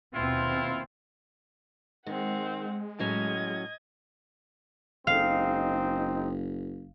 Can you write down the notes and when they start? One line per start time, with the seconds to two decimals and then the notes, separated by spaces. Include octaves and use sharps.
0.14 D#2 B2 C4 E4 F4
2.06 D#3 G#3 C4 F#5
2.99 A2 F#3 C#4 D#5 G#6
5.07 F#1 G#3 C4 D#4 F5